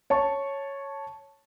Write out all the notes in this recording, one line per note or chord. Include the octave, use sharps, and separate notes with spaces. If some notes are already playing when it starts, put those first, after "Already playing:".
C#5 A5 C#6